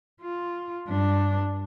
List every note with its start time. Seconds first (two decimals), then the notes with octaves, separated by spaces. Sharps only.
0.21 F4
0.88 G2 D4